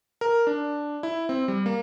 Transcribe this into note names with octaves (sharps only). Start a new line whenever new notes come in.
A#4
D4
E4
C4
G3
A#3